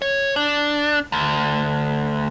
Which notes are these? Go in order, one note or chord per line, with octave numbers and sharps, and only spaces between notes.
C#5
D4
D2